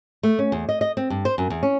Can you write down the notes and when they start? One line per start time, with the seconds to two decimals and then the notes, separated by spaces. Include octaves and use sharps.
0.23 A3
0.39 C#4
0.52 E2
0.69 D#5
0.81 D#5
0.97 C4
1.10 G2
1.25 C5
1.38 F#2
1.50 E2
1.63 C#4